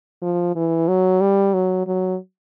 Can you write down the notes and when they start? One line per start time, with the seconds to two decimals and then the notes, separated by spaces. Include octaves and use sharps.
0.22 F3
0.56 E3
0.88 F#3
1.21 G3
1.54 F#3
1.87 F#3